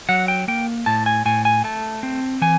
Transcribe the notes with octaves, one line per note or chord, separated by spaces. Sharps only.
F#3 F#5
G5
A#3 G5
A2 A5
G#5
A2 G#5
G#5
A3 A5
C4
E3 G#5